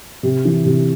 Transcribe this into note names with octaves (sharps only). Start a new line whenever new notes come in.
C3
E3
C3